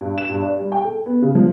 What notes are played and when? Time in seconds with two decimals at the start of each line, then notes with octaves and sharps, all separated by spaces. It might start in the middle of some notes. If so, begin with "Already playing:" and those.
0.01 G2
0.18 E7
0.30 G2
0.42 D5
0.59 G3
0.72 G5
0.84 A4
1.06 B3
1.22 C#3
1.35 F3